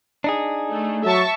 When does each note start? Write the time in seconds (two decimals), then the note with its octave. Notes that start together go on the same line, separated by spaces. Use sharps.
0.24 D4 D#4 G#4
0.71 A3
1.05 F#3 E5 A5 C#6